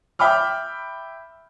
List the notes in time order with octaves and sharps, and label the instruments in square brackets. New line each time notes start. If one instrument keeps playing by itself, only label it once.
[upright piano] E5 G5 B5 D6 F6